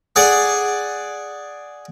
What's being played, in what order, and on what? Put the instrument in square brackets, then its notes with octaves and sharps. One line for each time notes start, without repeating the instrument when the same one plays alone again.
[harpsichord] G#4 D5 F#5 G#5